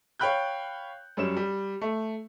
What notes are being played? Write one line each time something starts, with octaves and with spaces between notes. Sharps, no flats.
C#5 F5 G5 B5 F#6 G6
F#2 G3 C#4 E7
G3
A3